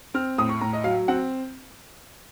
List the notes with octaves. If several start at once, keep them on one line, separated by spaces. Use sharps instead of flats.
C4 F6
A2 D#6
C#6
A2 A#5
D#5
F#3 F5
C4 F#5